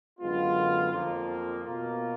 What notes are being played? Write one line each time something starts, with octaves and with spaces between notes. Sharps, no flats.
F#2 D3 G#3 B3 F4
F2 F3 A#3
B2 A#3 F4